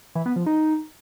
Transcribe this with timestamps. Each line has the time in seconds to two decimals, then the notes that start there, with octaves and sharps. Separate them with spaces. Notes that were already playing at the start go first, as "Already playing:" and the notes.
0.15 E3
0.26 B3
0.36 F3
0.46 D#4